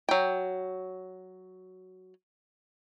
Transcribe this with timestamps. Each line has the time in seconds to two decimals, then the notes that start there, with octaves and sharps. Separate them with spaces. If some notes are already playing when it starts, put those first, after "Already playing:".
0.09 F#3 G5